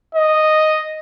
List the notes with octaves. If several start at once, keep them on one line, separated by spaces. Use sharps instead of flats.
D#5